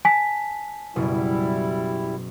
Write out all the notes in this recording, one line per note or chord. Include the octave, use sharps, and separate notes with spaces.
G#5 A5 B6
F#1 B2 G3 E4